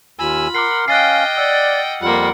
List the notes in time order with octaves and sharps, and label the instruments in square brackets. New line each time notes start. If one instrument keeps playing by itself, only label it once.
[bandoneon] D#2 G#5 E6 [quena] F4 [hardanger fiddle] B5
[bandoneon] A#4 F#5 C6 [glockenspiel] D6 F6 C7
[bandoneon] C#4 [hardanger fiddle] D#5 G5 [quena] F5 [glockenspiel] F#6 A6 C7
[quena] D5 [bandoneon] F#5 [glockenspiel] E6
[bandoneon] F2 G3 [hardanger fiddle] A#3 F#5 [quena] F4